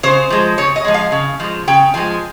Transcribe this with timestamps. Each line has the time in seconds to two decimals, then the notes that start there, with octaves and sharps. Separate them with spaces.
0.03 C#3 C5
0.30 F3 G#3
0.58 C#3 C#5
0.76 D#5
0.84 F3 G#3
0.94 F5
1.12 C#3
1.40 F3 G#3
1.67 C#3 G5
1.94 F3 G#3 G#5